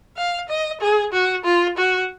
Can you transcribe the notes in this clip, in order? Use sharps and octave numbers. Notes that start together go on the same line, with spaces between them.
F5
D#5
G#4
F#4
F4
F#4